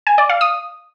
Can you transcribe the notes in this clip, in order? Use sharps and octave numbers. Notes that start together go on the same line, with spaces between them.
G#5
D5
F5
D#6